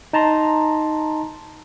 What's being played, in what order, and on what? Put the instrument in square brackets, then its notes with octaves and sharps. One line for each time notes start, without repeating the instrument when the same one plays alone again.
[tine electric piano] D#4 A5 A#5 C6